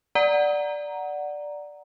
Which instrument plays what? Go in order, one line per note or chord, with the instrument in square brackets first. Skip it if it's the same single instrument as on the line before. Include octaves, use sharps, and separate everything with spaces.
[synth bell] D5 F#5 A#5